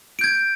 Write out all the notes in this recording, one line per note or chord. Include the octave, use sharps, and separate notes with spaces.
G6 G#6 D7